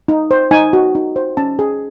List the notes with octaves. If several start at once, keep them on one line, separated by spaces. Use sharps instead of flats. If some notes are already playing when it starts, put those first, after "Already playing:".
D#4
C5
D#4 G#5
F#4
D#4
C5
C#4 A5
G#4